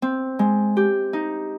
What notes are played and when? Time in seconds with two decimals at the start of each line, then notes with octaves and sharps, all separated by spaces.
0.02 C4
0.39 G#3
0.77 G4
1.13 D#4